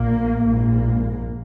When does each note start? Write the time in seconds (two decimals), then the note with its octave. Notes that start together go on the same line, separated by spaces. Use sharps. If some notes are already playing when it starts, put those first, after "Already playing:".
Already playing: A#1 A#2 A#3
0.45 A#1 G#2 A#3